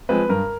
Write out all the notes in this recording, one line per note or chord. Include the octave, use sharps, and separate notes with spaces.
F3 G#3 C4 B4
G2 A#4